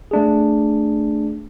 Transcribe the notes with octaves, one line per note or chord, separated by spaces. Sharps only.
A3 D4 G#4